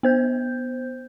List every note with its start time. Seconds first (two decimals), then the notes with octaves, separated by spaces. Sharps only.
0.03 B3 C5 G6